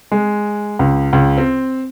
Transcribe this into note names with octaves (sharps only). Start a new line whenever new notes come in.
G#3
C#2
C#2
C4